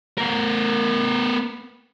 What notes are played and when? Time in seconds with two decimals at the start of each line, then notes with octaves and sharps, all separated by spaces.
0.18 B3 A#4